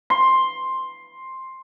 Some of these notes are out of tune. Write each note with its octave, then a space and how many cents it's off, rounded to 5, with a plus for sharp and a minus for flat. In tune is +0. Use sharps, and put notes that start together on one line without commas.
C6 +5